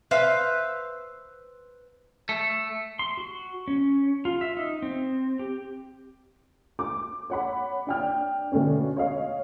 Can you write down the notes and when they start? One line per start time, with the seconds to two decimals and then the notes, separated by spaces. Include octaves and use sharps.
0.11 B4 C5 E5 F5
2.29 A3
2.99 C6
3.17 F#4
3.68 C#4
4.25 F4
4.41 E5
4.57 D#4
4.82 C4
5.39 G4
6.79 D6
7.30 C#5 F#5 B5
7.87 D4 G5 F6
8.52 B2 D3 A3 B3 C#4
8.97 C#5 D#5 F5